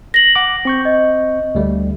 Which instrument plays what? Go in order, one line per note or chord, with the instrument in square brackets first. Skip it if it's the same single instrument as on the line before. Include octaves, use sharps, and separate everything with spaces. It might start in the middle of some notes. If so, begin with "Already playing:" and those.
[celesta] A#6 F#7
[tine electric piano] F#5 D6
C4 C#6 G6
[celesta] D#5
[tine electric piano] D2 G3 A3